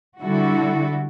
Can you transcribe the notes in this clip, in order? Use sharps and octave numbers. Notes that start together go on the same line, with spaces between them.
D3 G3 E4 F#4 A4